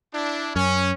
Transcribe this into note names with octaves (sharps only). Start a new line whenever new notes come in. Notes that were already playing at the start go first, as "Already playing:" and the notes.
D4 E4
F#2 C#4